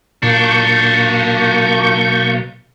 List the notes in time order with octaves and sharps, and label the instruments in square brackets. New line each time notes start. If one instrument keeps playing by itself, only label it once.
[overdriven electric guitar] B1 D4 [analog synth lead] A#2 [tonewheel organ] A#3 C#6 G6